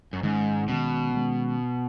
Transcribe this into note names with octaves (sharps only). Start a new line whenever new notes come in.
F#2
G#2 D#3 G#3 C#4
B2 D#3 G#3 C#4
D#3 G#3 C#4